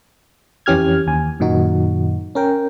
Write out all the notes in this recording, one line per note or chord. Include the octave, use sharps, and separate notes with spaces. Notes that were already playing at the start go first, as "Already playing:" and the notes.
F2 E3 C#4 G4 F6 G#6
D#2 G#5
F#2 A#2 D#3 D#4 F#4
C#4 A#4 G5